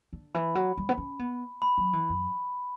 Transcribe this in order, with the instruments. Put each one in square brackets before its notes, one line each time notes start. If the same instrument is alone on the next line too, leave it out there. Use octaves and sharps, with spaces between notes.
[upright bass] D3
[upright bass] E3 [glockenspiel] B5
[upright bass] F#3
G3
B3
C#4
B3
[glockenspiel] B5
[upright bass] F#3
E3
F#2